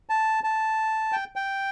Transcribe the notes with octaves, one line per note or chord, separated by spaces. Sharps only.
A5
A5
G5
G5